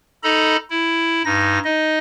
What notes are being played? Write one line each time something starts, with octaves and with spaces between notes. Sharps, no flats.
D#4 A4 D#5 A#5 B5
E4
G2 D#4 A#6
D#4 D#5